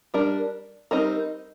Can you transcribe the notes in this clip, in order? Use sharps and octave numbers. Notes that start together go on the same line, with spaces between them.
G3 D4 A#4
G3 C4 D#4 A#4